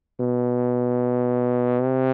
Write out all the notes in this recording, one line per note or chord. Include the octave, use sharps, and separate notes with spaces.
B2
C3